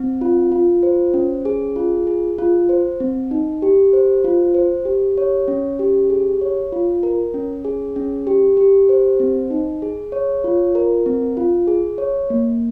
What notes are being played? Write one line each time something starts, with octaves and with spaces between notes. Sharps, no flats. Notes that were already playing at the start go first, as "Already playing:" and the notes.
Already playing: C4
F4
F4
C5
C#4
G#4
F4
G#4
F4
C5
C4
D#4
G4
C5
F4
C5
G4
C#5
C#4
G4
G#4
C#5
F4
A#4
C#4
G#4
C#4
G4
G4
C5
C4
D#4
G#4
C#5
F4
A#4
C4
F4
G#4
C#5
A#3